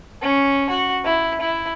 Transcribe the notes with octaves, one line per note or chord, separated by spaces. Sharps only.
C#4
F#4
E4
E4